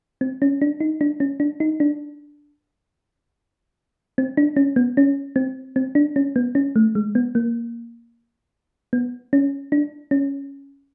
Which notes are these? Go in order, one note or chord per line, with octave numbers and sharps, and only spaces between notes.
C4
C#4
D4
D#4
D4
C#4
D4
D#4
D4
C4
D4
C#4
B3
C#4
C4
C4
D4
C#4
B3
C#4
A3
G#3
B3
A#3
B3
C#4
D4
C#4